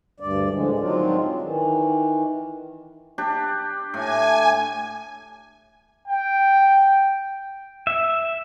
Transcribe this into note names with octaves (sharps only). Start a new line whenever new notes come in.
D2 G2 D5
A2 D3 F3 G#3
D#3 F#3 G#3 C4 D4 F4
D#3 E3
D4 G4
A2 G#5
G5
E5